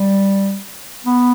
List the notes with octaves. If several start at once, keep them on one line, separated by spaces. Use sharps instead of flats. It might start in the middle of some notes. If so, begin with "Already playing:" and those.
Already playing: G3
B3